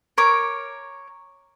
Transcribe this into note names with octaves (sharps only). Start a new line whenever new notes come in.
A#4 C#5 D6